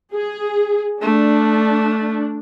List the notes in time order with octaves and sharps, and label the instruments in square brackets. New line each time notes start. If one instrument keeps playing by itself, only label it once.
[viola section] G#4
[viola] A3 [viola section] D4